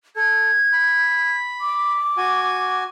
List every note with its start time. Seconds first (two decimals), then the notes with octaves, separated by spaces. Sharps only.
0.16 A4 G#6
0.73 B5
1.61 D6
2.17 F#4 G#5